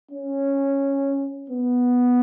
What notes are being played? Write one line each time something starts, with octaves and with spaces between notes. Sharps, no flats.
C#4
B3